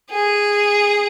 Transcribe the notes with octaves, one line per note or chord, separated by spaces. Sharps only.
G#4